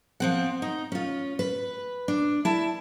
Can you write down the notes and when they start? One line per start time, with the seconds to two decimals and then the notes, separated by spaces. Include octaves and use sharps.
0.20 F3 C4 F#5
0.62 D#4
0.92 C#4 F4
1.39 B4
2.08 D4
2.45 E4 A5